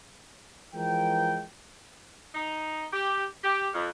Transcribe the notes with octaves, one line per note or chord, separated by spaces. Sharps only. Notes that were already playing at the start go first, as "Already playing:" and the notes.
E3 F3 G#3 A#4 G5
D#4
G4
G4
F2